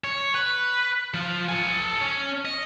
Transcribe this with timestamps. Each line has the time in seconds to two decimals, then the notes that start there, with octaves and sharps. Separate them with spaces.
0.04 C#5
0.35 B4
1.14 F3 F4
1.49 A4 G#5
2.01 C#4
2.45 D#5